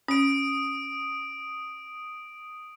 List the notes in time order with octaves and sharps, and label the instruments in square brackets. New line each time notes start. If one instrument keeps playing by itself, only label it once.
[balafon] C#4 [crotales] D#6 D7